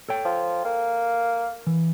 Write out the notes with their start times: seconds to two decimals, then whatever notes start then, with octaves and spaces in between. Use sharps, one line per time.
0.09 A4 C#5 G5
0.25 F3
0.65 A#3
1.67 E3